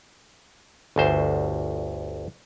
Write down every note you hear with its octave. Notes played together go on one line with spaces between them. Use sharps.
G1 D2 C5